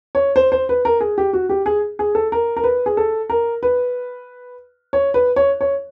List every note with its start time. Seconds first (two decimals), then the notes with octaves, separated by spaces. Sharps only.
0.15 C#5
0.36 C5
0.52 C5
0.69 B4
0.85 A#4
1.01 G#4
1.18 G4
1.33 F#4
1.49 G4
1.66 G#4
1.99 G#4
2.15 A4
2.32 A#4
2.56 A#4
2.64 B4
2.86 G#4
2.97 A4
3.29 A#4
3.63 B4
4.93 C#5
5.14 B4
5.36 C#5
5.61 C#5